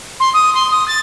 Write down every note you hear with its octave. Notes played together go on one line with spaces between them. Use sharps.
C6
D#6
C6
D#6
A6